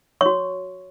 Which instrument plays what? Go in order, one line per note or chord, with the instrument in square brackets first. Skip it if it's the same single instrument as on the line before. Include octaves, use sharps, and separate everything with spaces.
[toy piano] F#4 C#5 C#6